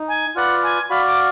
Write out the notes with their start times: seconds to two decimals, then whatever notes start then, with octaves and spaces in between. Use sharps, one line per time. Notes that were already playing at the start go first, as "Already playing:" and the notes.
Already playing: D#4
0.08 G#5
0.35 F4 B4 D5 F#5
0.63 G#5
0.89 F#4 D5 F5 B5
1.07 D6